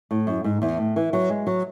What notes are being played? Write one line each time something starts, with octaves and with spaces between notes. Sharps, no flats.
A2
F#2
G#2
E2
A2
E3
F#3
G#3
F#3